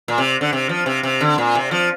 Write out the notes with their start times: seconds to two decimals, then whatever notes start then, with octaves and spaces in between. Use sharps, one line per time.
0.08 A#2
0.18 C3
0.41 D3
0.53 C3
0.69 F3
0.86 C3
1.03 C3
1.21 D3
1.38 A#2
1.55 C3
1.71 F3